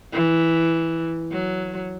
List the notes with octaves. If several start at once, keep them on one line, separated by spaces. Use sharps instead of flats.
E3
F#3